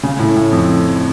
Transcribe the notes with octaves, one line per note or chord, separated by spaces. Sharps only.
C#3
A2
A2
F2